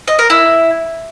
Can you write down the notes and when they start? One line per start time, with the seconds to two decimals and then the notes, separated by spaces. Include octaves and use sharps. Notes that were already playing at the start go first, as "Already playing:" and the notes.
0.08 D#5
0.19 A#4
0.30 E4